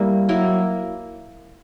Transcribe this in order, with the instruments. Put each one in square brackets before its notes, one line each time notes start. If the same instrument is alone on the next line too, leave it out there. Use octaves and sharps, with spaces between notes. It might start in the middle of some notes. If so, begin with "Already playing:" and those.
Already playing: [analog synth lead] G3 [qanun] A#3 E4 A#4
[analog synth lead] F#3 [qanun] A#3 E4 A#4